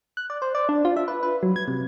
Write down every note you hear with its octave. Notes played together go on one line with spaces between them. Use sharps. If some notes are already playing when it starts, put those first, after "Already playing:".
F#6
D5
C5
D5
D4
F4
E5
B4
B4
F#3
G#6
C3